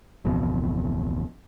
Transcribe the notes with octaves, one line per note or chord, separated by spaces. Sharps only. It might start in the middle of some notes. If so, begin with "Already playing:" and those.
D1 A1 F2 B2